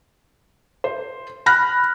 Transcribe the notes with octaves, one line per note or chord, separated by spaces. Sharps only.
C5
B5 F6 F#6 A#6